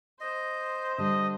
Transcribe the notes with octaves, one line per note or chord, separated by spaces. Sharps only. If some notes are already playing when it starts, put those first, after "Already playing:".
C5 D#5
D3 G3 D#5